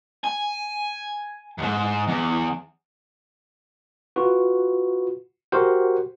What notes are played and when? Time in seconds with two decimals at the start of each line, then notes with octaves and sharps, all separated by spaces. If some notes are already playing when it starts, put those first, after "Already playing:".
0.24 G#5
1.58 D#2 G#2
2.07 E2
4.16 F4 F#4 B4
5.52 F#4 G4 A#4 C5 F#5